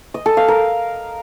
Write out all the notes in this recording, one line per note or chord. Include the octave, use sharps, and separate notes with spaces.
D#5
A4
F5
A#4